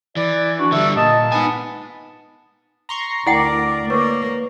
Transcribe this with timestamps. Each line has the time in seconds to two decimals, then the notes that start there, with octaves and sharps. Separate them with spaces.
0.16 E3 D5
0.59 D4 F#4
0.72 D3 G3 E5
0.96 A#2 D#5 A5
1.32 B3 D#4 G#5
2.89 A#5 C6 C#6
3.27 D2 E4 A#4 D5 F#5 G5
3.90 A#3 B4 C#5 C#6